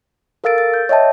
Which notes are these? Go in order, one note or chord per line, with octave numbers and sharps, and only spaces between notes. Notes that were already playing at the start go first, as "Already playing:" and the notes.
A4 A#4 F5 E6 A6 D7
A6
G6
C#5 D#5 E5 G5 A5